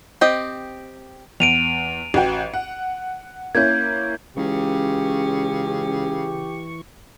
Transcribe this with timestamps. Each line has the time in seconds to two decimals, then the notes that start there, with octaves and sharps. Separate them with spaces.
0.21 C4 G4 D#5
1.40 E2 D7 D#7 F7
2.14 A1 F#4 G5
2.54 F#5
3.55 A#3 C#4 E4 G6 G#6
4.37 C#2 C#3 E3 G4 C#6